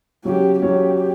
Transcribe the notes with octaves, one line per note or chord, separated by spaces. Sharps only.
C#3 F#3 C#4 G4
C#3 F#3 C#4 G4